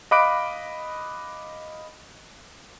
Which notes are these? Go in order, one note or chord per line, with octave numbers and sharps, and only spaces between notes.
D#5 F5 B5 D6 F#6 D7